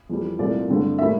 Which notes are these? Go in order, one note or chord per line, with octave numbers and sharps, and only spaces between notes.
F2 E3 G3
C2 A#2 A3 C4 D5
G2 D3 A3 C4
A2 G3 A#3 E5